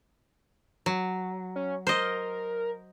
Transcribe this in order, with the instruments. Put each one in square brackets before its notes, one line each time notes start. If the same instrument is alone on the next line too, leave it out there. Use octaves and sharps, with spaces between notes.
[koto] F#3
[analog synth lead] C#4
[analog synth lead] A#4 [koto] C5 D#5